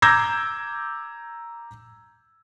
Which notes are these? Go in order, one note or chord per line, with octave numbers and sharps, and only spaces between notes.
A#5 D6 E6 G6 G#6 A#6